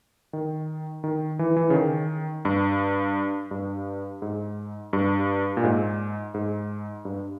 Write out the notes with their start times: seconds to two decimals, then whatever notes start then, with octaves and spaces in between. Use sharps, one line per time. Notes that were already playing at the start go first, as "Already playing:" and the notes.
0.33 D#3
1.04 D#3
1.39 E3
1.56 E3
1.70 C#3
1.74 D#3
2.45 G2
3.51 G2
4.22 G#2
4.93 G2
5.57 A#2
5.64 G#2
6.34 G#2
7.05 G2